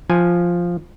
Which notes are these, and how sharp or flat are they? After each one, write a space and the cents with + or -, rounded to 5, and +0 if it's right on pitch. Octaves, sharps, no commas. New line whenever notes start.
F3 +0 G#5 +0